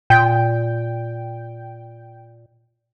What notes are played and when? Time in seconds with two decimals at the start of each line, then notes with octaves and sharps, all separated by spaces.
0.10 A#2 G5